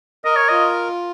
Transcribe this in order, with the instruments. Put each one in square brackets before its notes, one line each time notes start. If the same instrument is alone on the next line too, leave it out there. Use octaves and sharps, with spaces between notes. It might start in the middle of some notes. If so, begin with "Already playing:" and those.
[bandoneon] A#4 [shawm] D#5
[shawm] C#5
[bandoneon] F4 [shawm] D#5